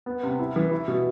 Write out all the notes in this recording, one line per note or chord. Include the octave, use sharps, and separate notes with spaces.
B3
C3
E4
E3
E4
B2